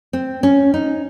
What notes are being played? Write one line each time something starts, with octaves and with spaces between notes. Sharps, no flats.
C4
C#4
D#4